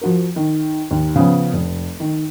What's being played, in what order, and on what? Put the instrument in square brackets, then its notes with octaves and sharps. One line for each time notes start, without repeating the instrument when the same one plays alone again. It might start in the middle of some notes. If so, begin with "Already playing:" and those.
[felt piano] F3 F#4 A#4
D#3
D#2
C#3 F3 B3 C#4
F1
D#3